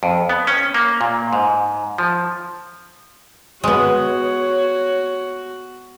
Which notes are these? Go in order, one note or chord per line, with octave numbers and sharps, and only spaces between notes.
F2
B3
C#4
A#3
A#2
G#2
F3
G#3 B3 F#4 C#5